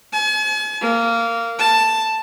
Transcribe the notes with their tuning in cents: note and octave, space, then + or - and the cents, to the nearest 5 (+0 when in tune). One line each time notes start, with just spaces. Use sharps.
G#5 +45
A#3 -15
A5 +5